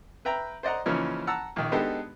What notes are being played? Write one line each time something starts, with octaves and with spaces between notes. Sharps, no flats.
B4 E5 G5 A#5
C5 D5 D#5 F#5 A#5
C#3 E3 F3 A#3 C#4 D#4
F#5 A5 A#5 E6
A#1 D#3
G#3 B3 D4 D#4 G4 A4